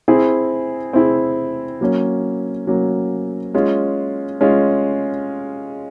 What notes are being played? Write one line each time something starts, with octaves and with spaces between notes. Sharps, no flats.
C4 E4 G#4
C4 E4 G#4
F#3 A#3 C#4
F#3 A#3 C#4
G#3 C#4 F4
G#3 C#4 F4